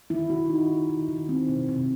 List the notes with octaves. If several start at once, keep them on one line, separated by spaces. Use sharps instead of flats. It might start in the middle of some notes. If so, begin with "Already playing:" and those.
D#3 E4
D#3 F#4
D#4
D#3
D#3
D#3
C4
C3
C3